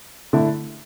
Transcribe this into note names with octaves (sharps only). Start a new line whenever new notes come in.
D3 A3 E4